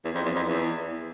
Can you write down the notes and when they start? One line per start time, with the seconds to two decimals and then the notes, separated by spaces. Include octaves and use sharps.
0.05 E2
0.15 F2
0.25 E2
0.36 F2
0.46 E2